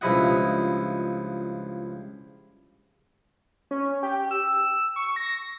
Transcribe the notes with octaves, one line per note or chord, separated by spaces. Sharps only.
C#2 G2 F3 E4 D#5 F#5
C#4
G4
E6
C#6
A#6